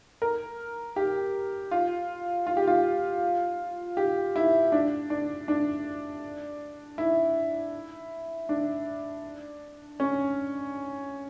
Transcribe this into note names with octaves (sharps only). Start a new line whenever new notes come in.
A#4
G4
F4
F4
G4
F4
G4
E4
D4
D4
D4
E4
D4
C#4